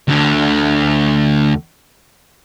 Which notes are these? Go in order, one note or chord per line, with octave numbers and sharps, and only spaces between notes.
D2 D3